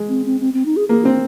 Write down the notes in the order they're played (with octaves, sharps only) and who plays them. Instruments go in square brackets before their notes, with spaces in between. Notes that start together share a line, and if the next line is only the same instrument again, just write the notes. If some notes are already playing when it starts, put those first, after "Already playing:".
Already playing: [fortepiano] G#3
[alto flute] C4
C4
C4
C4
D#4
G#4
[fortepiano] A#3 [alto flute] G#4
[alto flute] A#3 [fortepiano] C4